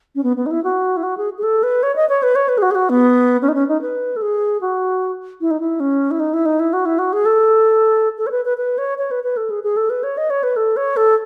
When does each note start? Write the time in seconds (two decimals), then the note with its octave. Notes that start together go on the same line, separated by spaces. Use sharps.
0.15 C#4
0.23 B3
0.37 B3
0.46 D#4
0.51 E4
0.64 F#4
0.97 E4
1.03 F#4
1.17 G#4
1.38 G#4
1.43 A4
1.63 B4
1.83 C#5
1.96 D#5
2.09 C#5
2.23 B4
2.35 C#5
2.49 B4
2.58 G#4
2.62 F#4
2.71 G#4
2.75 F#4
2.89 B3
3.42 C#4
3.48 D#4
3.54 C#4
3.68 D#4
3.81 B4
4.16 A4
4.22 G#4
4.61 F#4
5.41 E4
5.51 D#4
5.60 E4
5.80 C#4
6.11 E4
6.20 D#4
6.34 E4
6.46 D#4
6.59 E4
6.73 F#4
6.85 E4
6.98 F#4
7.13 G#4
7.25 A4
8.18 A4
8.27 C#5
8.31 B4
8.45 B4
8.57 B4
8.78 C#5
8.98 C#5
9.11 B4
9.24 B4
9.37 A4
9.50 G#4
9.63 G#4
9.76 A4
9.90 B4
10.03 C#5
10.17 D#5
10.30 C#5
10.43 B4
10.56 A4
10.76 C#5
10.96 A4